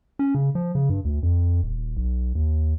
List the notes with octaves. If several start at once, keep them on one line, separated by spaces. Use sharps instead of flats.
C#4
C#3
F3
C#3
G2
D2
F2
D#1
B1
D#2